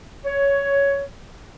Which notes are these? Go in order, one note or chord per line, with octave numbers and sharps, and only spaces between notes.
C#5